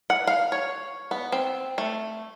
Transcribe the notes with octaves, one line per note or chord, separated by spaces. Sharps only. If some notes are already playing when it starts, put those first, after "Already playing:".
F#5
F5
C#5
B3
C4
A3